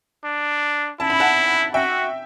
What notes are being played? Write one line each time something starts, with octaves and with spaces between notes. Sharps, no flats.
D4
E4 A5
B5
F#5 A5
F#4 E5 G5